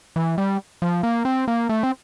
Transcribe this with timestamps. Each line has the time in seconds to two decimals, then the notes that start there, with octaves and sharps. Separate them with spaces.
0.16 E3
0.38 G3
0.82 F3
1.03 A#3
1.25 C4
1.48 A#3
1.69 A3
1.83 C4